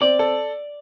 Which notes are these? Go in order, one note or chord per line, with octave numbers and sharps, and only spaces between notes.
C4 D5
A4